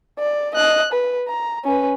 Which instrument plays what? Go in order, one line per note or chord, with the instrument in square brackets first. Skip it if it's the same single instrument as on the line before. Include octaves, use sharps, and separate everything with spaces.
[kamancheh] D5
D#5 F#6
B4
A#5
C#4 B4